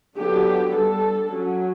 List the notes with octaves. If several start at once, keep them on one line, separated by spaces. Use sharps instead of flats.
D3 F#3 B3 D4 G4
G3 D4 A4
F#3 C#4